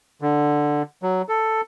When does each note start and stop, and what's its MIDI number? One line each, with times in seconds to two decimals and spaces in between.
0.22 0.82 50
1.03 1.22 54
1.29 1.61 69